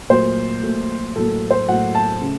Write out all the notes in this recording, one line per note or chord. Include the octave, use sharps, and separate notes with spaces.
A#2 F#3 A3 C5
A#2 F#3 A3
A2 F#3 A#3 A4
C5
A2 F#3 A#3 F#5
A5
C#3 A3